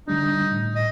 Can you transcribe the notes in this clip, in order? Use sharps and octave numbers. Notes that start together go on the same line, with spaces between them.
D3 G3 D4 D#4
A2
D#5